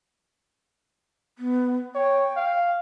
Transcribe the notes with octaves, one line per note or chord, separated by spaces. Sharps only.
B3
C#5 G5
F5